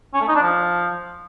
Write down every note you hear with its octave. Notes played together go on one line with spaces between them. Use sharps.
C#4
A3
D#4
D4
F3